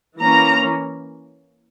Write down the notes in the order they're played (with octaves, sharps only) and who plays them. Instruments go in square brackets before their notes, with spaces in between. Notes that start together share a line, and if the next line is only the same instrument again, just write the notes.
[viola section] E3 A#3 C#4 A#5